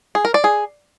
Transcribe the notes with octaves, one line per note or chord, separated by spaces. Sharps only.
G#4
A#4
D5
G#4